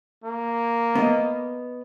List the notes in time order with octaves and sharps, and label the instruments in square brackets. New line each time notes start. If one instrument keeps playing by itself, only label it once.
[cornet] A#3
[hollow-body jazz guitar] B3 D#5